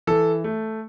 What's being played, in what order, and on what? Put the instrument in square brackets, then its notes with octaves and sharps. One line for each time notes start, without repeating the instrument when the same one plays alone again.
[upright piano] E3 [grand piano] A4
[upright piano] A3